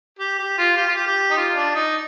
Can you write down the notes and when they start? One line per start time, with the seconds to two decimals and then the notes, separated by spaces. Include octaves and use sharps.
0.19 G4
0.39 G4
0.58 F4
0.77 G4
0.87 F4
0.96 G4
1.06 G4
1.31 D#4
1.37 F4
1.55 D4
1.75 D#4